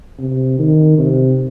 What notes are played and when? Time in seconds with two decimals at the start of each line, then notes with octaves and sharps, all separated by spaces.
0.19 C3
0.59 D#3
0.98 C3